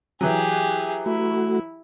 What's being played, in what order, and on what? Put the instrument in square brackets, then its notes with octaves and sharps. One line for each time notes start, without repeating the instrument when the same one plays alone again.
[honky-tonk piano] E3 F#3 [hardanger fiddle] G4 G#4
[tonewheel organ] A3 F#4 [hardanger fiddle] E4